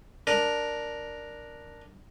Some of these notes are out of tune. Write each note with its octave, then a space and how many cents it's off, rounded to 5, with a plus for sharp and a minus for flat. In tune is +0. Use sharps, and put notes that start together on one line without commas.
D4 +5 A#4 +0